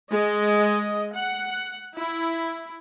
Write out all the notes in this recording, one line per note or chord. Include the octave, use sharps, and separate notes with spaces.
G#3 D#5
F#5
E4